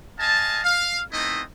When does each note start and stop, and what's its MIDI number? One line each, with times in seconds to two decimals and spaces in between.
0.20 0.60 75
0.20 0.60 77
0.20 0.60 80
0.20 0.60 81
0.64 1.00 77
1.12 1.43 57
1.12 1.43 59
1.12 1.43 60
1.12 1.43 63
1.12 1.43 64
1.12 1.43 75